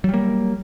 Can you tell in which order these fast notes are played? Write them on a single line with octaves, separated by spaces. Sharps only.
F#3 G3 A#3